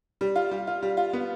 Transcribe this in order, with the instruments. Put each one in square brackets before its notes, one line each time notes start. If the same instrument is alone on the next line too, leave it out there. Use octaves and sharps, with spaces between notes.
[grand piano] G3
F4
G3
F4
G3
F4
B3